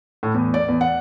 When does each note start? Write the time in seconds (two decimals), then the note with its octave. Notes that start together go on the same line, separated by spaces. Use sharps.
0.23 A2
0.34 E2
0.54 D5
0.68 E2
0.81 F#5